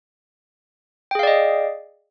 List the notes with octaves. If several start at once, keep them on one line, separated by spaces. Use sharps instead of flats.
G#4 D5 D#5 F5 G5